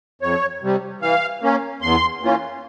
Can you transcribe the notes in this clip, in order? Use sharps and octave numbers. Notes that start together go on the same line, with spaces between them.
F2 C#5
C3 G3
E3 F5
A#3 C#4
E2 C6
E3 A#3 C#4 F4